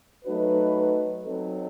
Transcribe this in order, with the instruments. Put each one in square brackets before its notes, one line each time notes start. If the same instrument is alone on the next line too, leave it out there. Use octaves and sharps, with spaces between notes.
[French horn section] F#3 A3 D#4 F#4 B4
F#3 C4 D#4 A4